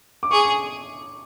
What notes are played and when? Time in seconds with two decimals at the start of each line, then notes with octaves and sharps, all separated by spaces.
0.23 D6
0.31 G#4 C#6
0.45 C#6